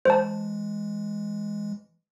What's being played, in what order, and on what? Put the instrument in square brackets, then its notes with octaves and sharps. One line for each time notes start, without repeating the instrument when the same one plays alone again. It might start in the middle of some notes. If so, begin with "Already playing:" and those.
[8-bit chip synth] E3 G#3 [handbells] C5 A5